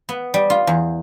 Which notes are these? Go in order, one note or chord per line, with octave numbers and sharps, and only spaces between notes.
B3
G3
F4
E2